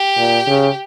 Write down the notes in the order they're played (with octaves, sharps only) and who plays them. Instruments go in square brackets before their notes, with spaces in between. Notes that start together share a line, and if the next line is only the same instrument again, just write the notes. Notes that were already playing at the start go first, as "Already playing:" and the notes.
Already playing: [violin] G4
[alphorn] A#2
C#3